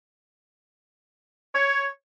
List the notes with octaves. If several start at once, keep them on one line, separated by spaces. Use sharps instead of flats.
C#5